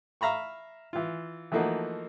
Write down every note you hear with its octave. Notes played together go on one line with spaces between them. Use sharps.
E5 F5 A#5 B5 C#6
E3 F4
E3 F3 A3 A#3 D#4 F#4